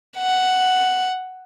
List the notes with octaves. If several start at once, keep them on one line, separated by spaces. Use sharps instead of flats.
F#5